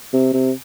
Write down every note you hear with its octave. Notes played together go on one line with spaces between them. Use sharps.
C3
C3